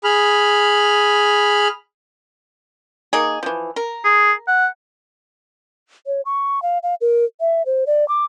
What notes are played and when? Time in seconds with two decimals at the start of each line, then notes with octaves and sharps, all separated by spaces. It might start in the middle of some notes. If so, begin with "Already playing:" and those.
0.04 G#4 B5 F6
3.13 A#3 D#4 G#4
3.43 E3 F3
3.76 A#4
4.04 G#4
4.47 F#5
6.07 C#5
6.25 C#6
6.63 F5
6.83 F5
7.01 A#4
7.40 E5
7.66 C5
7.87 D5
8.08 D6